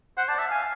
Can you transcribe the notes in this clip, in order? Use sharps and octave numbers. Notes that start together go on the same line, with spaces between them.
C5 F#5
D5 A5
E5 A5
F5 G#5